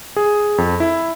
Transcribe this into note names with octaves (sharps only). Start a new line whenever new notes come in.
G#4
F2
E4